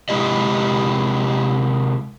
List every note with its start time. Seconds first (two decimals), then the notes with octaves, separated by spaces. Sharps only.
0.09 C3 G#3 C#4 E4 G4 D#5